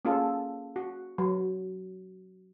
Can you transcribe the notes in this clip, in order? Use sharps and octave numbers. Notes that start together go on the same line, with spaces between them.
A#3 C#4 F4 G#4 A4
F#4
F#3